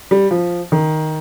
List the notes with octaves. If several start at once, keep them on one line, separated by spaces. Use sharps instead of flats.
G3
F3
D#3